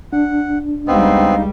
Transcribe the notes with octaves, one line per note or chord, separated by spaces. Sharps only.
D4 F#5
C#2 G3 B3 C4 D#4 D#5 F5